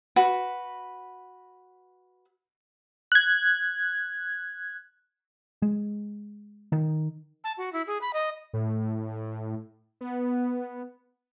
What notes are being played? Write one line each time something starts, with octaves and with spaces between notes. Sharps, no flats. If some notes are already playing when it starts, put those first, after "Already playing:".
F#4 B4
F#6 G#6
G#3
D#3
A5
F#4
E4
G#4
B5
D#5
A2
B3